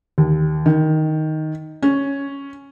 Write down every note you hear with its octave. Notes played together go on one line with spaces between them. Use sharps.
D#2
D#3
C#4